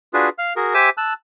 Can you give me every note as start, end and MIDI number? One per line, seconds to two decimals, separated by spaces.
0.14 0.29 62
0.14 0.29 65
0.14 0.29 66
0.14 0.29 68
0.14 0.29 71
0.38 0.53 77
0.38 0.53 89
0.56 0.74 66
0.56 0.74 68
0.56 0.74 70
0.74 0.89 67
0.74 0.89 72
0.74 0.89 76
0.74 0.89 80
0.74 0.89 86
0.74 0.89 88
0.98 1.13 81
0.98 1.13 88
0.98 1.13 90